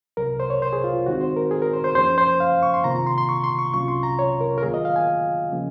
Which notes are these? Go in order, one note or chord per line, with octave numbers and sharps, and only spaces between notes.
C2 C3 F#3 A#4
C5
C#5
C5
G#4
F4
D#2 D#3 G#3 C4 D#4 F#4
C5
A#4
G#4
A#4
C5
C5
F#2 F3 A#3 C#4 C5
C5
F5
C#6
C6
C3 D#3 A#3 F4 A#5
A#5
C6
C6
C#6
C6
C#6
C2 C3 F#3 C#4 F4 C#6
C6
A#5
C#5
A#4
A#4
D#2 D#3 F#3 A#3 F4 G#4
D#5
F5
G#5
C#3 F3 A#3 C#4